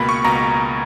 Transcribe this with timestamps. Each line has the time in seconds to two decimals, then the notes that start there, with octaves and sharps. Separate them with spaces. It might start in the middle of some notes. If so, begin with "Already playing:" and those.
Already playing: C#2 B2 A#3 B5
0.09 C#6
0.24 C#2 B2 A#3 A#5